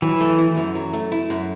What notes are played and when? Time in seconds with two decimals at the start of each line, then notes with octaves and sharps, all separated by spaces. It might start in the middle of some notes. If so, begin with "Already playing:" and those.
0.02 E3 F#3
0.20 A3
0.38 E4
0.57 F#2
0.75 F#3
0.93 A3
1.12 E4
1.30 F#2